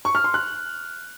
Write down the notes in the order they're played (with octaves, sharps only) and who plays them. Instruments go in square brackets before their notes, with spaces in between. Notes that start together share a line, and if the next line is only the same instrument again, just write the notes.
[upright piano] C#6
F6
C6
F#6